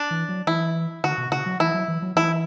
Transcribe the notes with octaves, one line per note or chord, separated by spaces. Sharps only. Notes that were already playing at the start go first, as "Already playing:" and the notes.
Already playing: D4
E3
F#3
E3 E4
D3 F#4
B2
C#3 F#4
F#3
E3 E4
F#3
E3
F#3
E3 E4